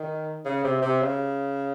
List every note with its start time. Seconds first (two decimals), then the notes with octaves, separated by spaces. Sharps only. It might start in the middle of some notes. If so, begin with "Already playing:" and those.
Already playing: D#3
0.45 C#3
0.64 C3
0.82 C3
1.01 C#3